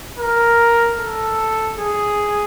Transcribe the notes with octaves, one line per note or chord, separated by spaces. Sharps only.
A#4
A4
G#4